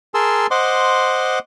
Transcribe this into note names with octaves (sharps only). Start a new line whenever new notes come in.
G#4 A#4 A5 C6 E6
C5 D#5 F#5 C6 D6